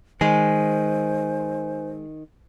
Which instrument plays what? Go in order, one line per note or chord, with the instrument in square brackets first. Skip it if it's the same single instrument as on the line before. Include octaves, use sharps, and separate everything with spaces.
[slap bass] D#3 [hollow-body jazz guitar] G#3 [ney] C5 [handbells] G#5